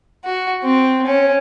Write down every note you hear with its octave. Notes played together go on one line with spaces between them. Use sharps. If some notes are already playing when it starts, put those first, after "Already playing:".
F#4
C4
C#4